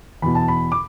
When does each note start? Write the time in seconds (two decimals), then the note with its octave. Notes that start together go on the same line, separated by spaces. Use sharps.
0.22 E2 B2 B5
0.35 A5
0.48 B5
0.72 D6